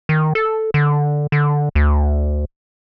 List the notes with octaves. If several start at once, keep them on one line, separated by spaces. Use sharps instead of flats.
D#3
A4
D3
D3
D2